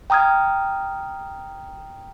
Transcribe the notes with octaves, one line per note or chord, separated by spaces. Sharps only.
G5 A#5 D#6 F6 G#6